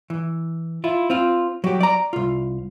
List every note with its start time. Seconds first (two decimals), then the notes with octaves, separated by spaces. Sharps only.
0.10 E3
0.84 E4 F4
1.10 C4 F4
1.64 F#3 G4
1.80 D5 A#5
2.13 C2 F4